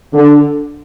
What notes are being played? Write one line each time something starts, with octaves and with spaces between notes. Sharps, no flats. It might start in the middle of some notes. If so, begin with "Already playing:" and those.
D3